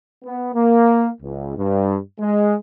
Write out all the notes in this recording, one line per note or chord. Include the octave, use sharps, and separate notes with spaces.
B3
A#3
C#2
G2
G#3